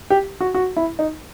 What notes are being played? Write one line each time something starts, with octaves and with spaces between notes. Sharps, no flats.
G4
F#4
F#4
E4
D#4